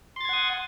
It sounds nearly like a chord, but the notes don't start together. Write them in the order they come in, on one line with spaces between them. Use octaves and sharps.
C6 A6 G#6 F#5 D#6